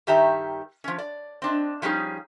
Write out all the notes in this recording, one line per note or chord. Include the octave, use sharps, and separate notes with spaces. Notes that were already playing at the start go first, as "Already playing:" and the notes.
G2 D#3 G4 E5 A#5
F3 C#4
D5
C4 D4 D#5
F3 G3 C#4 D#4 G#4